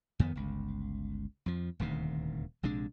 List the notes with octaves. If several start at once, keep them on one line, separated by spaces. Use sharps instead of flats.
F2 D#3 B3
G1 C#2
F2 F3
D#1 D2 C3 D#3
A#1 C3 G#3 D4